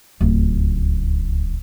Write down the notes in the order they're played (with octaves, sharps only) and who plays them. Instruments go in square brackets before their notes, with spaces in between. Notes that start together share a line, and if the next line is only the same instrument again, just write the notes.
[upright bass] D1 C#2